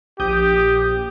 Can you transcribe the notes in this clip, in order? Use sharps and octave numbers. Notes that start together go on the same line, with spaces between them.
A#1 G4 D#6 G6